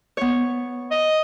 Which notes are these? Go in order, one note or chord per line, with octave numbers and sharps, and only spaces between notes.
B3 C#5
D#5